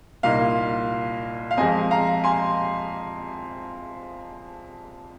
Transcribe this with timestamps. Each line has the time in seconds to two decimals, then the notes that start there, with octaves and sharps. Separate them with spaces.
0.23 C2 A#2 A#3 D#4 F5
1.51 F5
1.57 F2 F3 G#3 C4 D#5 G#5
1.91 F5 A#5
2.24 G#5 C6